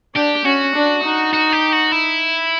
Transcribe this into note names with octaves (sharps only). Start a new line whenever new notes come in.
D4 G4
C#4 F#4
D4
D#4
F#4
G4
F#4
E4